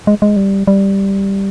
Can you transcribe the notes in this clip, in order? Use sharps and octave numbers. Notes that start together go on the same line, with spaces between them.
G#3
G#3
G3
G3